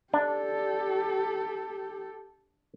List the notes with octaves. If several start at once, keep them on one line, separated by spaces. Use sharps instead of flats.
D4 G4 A4